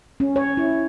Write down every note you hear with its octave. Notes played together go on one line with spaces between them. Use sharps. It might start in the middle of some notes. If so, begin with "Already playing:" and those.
C#4
C#5
E4